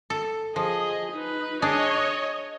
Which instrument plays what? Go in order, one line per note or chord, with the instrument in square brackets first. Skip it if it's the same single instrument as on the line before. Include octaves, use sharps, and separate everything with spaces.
[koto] A4
[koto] F3 [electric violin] G#4 D#5
[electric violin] D#4 B4
[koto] D4 G#4 [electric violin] C#5 D#5